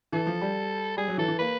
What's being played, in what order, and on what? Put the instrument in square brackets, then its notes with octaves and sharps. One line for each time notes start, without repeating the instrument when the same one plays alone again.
[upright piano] E3 [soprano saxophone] A4
[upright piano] F3
G3
[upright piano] G3 [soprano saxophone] G#4
[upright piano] F#3
[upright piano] E3 [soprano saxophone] A4
[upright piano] E3
[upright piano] A#3 [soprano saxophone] B4